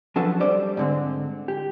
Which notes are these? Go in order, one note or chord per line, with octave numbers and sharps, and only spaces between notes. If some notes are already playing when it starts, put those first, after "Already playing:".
F3 F#3 D4 F#4 A4 B4
G3 C5 D5
G#2 D3 C4
G4